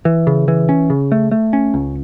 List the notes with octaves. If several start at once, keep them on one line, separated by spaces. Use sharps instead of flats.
E3
C#3
E3
C#4
C#3
A3
A3
C#4
C#2